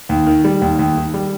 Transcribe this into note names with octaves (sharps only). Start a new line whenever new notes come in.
D#2
D#3
G3
D#2
D#2
D#3
G3